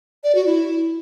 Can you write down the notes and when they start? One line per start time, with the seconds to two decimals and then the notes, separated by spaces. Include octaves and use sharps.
0.24 D5
0.35 F#4
0.46 E4